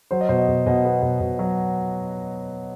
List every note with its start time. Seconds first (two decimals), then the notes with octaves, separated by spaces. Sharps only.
0.11 F#3 C5
0.21 D#5
0.29 B2 C5
0.38 D#5
0.49 B2
0.66 B2 D#5
0.85 B3
1.02 B2
1.21 B2
1.39 F#3